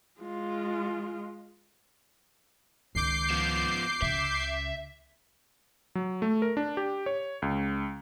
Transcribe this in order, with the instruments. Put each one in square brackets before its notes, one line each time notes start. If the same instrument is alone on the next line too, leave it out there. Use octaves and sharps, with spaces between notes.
[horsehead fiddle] G#3 F4
[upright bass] C#2 D#3 [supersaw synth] D6 G6 C7
[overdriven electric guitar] F3 B3
[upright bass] C#2 C#3 [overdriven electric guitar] E5
[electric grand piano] F#3
A3
A#4
D4
G4
C#5
C#2